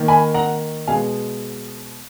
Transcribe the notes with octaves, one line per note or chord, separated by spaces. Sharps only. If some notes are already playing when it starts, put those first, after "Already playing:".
Already playing: D#3 A#3
G#5 B5
F#5 A#5
B2 G#3 B3 F5 G#5